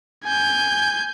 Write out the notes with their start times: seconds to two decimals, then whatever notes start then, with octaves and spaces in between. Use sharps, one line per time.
0.24 G#5 G6